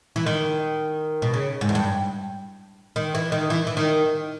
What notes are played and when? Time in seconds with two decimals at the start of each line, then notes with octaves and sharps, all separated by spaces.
0.16 E3
0.26 D#3
1.22 B2
1.34 C#3
1.61 G#2
1.69 E2
1.75 G2
2.96 D#3
3.15 E3
3.32 D#3
3.50 E3
3.67 E3
3.77 D#3